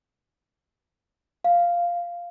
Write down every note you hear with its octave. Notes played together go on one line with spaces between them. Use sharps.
F5